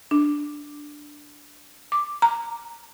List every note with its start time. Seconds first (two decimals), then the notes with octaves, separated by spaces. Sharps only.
0.11 D4
1.92 D6
2.22 A#5